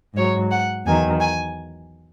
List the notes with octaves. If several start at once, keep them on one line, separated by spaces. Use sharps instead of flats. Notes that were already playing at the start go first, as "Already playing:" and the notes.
G#2 F#3 C#5
F#5
E2 D#3 F#3 G#5
G#5